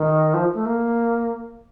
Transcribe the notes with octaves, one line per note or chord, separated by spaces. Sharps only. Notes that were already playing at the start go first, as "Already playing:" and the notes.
Already playing: D#3
F3
A3
A#3